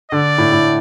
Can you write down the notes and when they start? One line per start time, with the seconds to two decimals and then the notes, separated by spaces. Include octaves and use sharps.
0.12 D3 D5
0.38 A2
0.52 A2